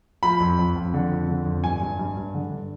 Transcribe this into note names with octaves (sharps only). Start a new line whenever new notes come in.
F3 B5
F2
F2
F2
D3
F2
D3
F2
G2 G#5
G2
G2
G2
D3
G2